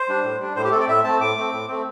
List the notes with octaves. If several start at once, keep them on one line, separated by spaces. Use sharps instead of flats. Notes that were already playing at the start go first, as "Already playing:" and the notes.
Already playing: C5
G3 D4
A2
G3 D4
A2 C5
G4
A3 C4 A4
D5
A2 E5
A3 C4 A5
A2 D6
A3 C4
A2
A3 C4